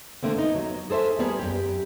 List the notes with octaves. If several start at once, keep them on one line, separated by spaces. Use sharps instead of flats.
D3 A3 A#3 C4
B3 D#4
F#3
G#4 A4 C5 C#5 E5
G3 A#3 B3 G#4
F#2 A#2 G4